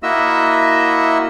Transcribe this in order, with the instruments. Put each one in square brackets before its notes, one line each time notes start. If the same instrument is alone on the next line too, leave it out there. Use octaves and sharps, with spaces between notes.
[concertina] A#3 E4 F#4 D#5 E5 E6